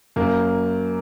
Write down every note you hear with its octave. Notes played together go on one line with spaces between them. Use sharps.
F#2 A#3